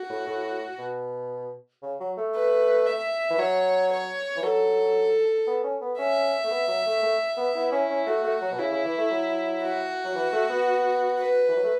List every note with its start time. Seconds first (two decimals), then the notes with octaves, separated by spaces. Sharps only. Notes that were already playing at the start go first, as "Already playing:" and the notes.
Already playing: F#4
0.10 A2
0.27 A2
0.79 B2
1.83 C#3
2.00 F#3
2.17 A3
2.35 B4
2.86 E5
3.30 E3
3.38 F#3 C#5
3.92 C#5
4.37 E3
4.43 F#3 A4
5.47 B3
5.64 C#4
5.81 B3
5.98 C#4 E5
6.45 A3
6.51 B3
6.68 F#3
6.86 A3
7.03 A3
7.37 B3
7.55 B3 E4
7.72 C#4
7.89 C#4
8.06 A3 F#4
8.24 A3
8.41 F#3
8.52 B2
8.58 C#3 E4
8.72 C#3
8.85 E3
8.98 A3
9.11 F#3
9.62 F#4
10.05 F#3
10.15 E3
10.33 A3
10.50 B3
11.19 B4
11.49 E3
11.57 F#3
11.64 A3